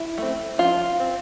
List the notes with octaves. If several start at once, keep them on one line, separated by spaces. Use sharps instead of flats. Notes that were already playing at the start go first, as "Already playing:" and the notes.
Already playing: E4
A3 C4
F3 F4
C4